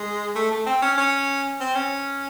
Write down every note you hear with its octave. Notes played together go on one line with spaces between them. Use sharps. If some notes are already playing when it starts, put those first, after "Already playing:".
Already playing: G#3
A3
A3
C4
C#4
C#4
C4
C#4